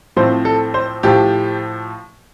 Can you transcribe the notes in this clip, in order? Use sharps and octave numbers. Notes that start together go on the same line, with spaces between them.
A2 F3 C4 C5
A4
C5
A2 F3 G4